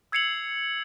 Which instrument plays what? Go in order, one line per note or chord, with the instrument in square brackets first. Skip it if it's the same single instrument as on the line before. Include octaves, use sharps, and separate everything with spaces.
[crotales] E6 G#6 C7 C#7 F7 F#7